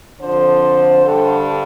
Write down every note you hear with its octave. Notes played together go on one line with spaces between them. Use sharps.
F2 D3 F3 C5
G2 D3 G3 A4